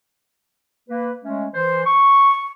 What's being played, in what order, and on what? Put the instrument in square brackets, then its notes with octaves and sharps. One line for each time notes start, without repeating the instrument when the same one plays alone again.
[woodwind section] A#3 B4
G#3 A3 C#4
E3 C5
C#6